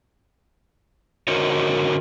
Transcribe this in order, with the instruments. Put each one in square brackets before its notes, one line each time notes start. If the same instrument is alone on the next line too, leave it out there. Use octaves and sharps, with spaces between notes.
[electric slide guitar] D3 F#4 A#4 C5 C#5